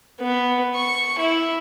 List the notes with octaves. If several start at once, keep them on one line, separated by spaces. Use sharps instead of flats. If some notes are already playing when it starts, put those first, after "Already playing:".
B3
C#6
E4